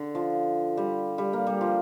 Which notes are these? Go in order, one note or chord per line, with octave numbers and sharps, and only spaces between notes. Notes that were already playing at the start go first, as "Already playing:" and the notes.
Already playing: D3
F3
G3
G3
A#3
G3
F3